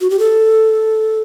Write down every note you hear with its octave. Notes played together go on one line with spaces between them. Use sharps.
F#4
G4
A4